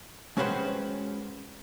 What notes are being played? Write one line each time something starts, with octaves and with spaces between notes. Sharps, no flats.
G#3 C#4 F#4 B4 C5 G5